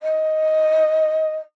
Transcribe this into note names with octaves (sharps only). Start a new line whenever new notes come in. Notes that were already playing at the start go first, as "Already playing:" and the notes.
D#5